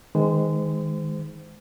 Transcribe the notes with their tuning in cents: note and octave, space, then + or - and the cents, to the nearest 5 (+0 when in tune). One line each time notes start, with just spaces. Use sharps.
D#3 +20 G#3 +0 C5 -30